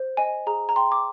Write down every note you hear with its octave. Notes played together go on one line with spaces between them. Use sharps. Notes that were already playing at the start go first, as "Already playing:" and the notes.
Already playing: C5
D#5 G#5
G#4 A#5
A#5
G5 C6
D6